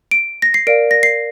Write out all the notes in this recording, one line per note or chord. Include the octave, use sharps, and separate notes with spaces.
D7
A#6
C7
A#4 D5 F5 D7
A#6
C7